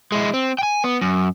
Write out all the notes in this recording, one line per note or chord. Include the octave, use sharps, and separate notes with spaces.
G#3 E4
C4
G5 G#5
B3
F#2